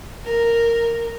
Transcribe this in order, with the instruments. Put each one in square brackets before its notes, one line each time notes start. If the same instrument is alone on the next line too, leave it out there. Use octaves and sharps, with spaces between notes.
[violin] A#4